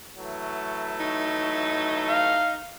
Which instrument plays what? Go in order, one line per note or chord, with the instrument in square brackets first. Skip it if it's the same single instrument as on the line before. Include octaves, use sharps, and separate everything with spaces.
[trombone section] E3 F#3 A3
[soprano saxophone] D#4
[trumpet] F5